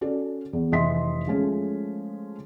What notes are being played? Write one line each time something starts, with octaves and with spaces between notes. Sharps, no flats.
C#4 F#4 A4 D5
E2
F1 E3 D#5 E5 C6 B6
F3 G#3 A3 C#4 F4